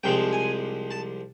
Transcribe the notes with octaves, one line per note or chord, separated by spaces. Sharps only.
C2 C3 F3 G#3 G5
G#5
A5